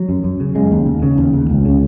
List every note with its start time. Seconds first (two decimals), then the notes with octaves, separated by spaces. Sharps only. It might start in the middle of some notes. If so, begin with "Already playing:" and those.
Already playing: F#3
0.09 F#2
0.24 F#2
0.40 C#3
0.55 C#3 G#3
0.72 D#2
0.87 D#2
1.02 C#3
1.18 D#2
1.33 D#2
1.50 C#2
1.65 C#3